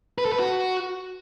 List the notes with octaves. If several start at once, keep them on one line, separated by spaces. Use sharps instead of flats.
B4
A4
B4
F#4